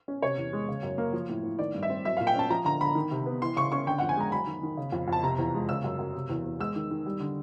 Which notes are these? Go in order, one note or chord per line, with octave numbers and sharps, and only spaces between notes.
C#4
C3 C#5
E2
G#3
C#3
F#2
A#3
F3
A2
A2
D#3 D5
G2
E5
C4
F#3 E5
A#2 F5
G5
C#4 A5
F3 A#5
D3 A#5
D3 B5
D#3
C3
B3
E3 C6
C#3 C#6
C#4 C#6
D3 G5
F2 F#5
G#5
G#3 A#5
F#3 B5
D#3
D#3
C#3
F2
F2 A5
C3 A#5
E2
G#3
C#3 E6
F#2
F#2
C3
E2
E2
G#3 E6
D#3
D#3
G3
D3